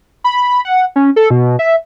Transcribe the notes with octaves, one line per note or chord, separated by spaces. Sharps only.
B5
F#5
C#4
A4
B2
E5